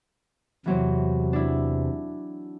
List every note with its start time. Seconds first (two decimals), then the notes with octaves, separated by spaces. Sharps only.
0.66 E2 C3 E3 F#3 C4
1.33 D4 E4